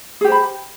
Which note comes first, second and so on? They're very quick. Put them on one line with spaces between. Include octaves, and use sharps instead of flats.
G#4 G4 C5 B5